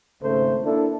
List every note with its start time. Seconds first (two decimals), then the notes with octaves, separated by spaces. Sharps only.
0.23 G#1 C#3 A3 A4 C5
0.64 A#3 D4 E4 A4